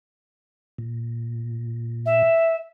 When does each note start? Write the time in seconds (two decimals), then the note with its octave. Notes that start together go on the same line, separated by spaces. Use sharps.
0.78 A#2
2.06 E5